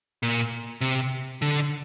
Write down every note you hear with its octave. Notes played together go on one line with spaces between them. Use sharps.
A#2
C3
D3